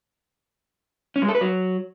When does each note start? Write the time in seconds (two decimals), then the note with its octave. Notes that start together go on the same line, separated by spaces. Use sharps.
1.16 C#4
1.22 G#3
1.28 A4
1.35 B4
1.41 F#3